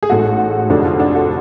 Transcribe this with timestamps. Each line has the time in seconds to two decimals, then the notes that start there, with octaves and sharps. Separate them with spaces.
0.03 G#4
0.09 A1 G#2 G#3 F#4 A4
0.70 F1 F2 D3 G#3 D4 F#4
0.85 F4
1.00 D4 F#4
1.15 F#4 A4